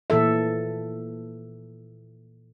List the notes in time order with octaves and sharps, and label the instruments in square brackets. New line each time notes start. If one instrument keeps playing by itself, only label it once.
[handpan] A#2 E3 A4 E5